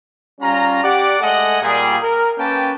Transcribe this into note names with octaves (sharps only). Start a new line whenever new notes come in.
G3 C#4 F4 A#5
G4 D5 F#5
G#3 A3 A4 D#5 F#5 G#5
A#2 G3 G#4
A#4
A#3 C#4 G4 B4 G5 A5